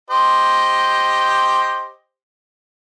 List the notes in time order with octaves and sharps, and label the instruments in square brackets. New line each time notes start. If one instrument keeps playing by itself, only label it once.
[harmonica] G4 C5 D#5